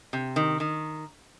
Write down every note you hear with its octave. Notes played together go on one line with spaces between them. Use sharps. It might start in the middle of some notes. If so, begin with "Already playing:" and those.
C3
D#3
D#3